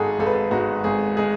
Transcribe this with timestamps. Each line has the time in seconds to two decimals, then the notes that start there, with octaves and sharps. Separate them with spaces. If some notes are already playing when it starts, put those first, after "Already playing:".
Already playing: G#1 G#2 G#3 G#4 A4
0.19 G#1 A4
0.26 B4
0.33 A4
0.51 G#2 G#3 F#4
0.84 G#1 G#4
1.17 G#3 G#4